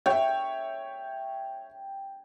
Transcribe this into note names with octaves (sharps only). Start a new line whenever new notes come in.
C#5 E5 G5